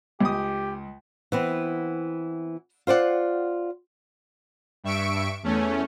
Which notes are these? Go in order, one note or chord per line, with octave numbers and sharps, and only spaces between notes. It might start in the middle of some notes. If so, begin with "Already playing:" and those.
C#2 G4 D#6
E3 B3 C4
F4 C5 D5 F#5
G2 E5 C#6 D7
E2 A3 C#4